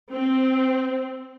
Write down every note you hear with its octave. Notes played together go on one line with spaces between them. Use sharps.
C4